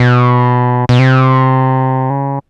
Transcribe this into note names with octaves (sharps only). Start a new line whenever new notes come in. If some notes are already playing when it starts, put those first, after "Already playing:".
Already playing: B2
B2
C3
C#3